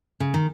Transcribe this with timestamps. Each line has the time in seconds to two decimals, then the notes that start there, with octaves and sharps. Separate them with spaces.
0.20 C#3
0.34 D#3